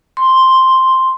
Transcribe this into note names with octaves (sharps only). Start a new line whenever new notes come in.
C6